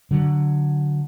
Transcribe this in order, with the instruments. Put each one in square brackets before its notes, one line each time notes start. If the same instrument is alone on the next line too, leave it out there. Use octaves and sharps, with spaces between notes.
[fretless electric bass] D3 F#3